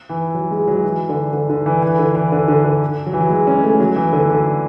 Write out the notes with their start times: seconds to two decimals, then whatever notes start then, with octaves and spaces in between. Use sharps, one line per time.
0.09 E3
0.34 F#3
0.51 G#3
0.68 F#3
0.84 E3
1.09 D3
1.33 D3
1.50 D3
1.66 E3
1.82 E3
1.99 D3
2.15 E3
2.32 D3
2.48 D3
2.65 D3
3.06 F#3
3.13 E3
3.21 F#3
3.30 G#3
3.47 C#4
3.64 A3
3.80 F#3
3.96 E3
4.13 D3
4.30 D3